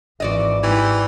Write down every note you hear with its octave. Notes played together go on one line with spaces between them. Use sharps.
G#1 E3 F#4 D5 D#5
G#2 E3 G3